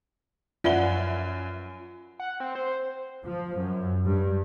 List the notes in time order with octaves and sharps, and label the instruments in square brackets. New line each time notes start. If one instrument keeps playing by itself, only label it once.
[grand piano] F#2 B4 G7 [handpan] F4 [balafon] D5 E5 F#5
[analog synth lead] F#5
C4
C5
[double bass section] F3
F#2
G2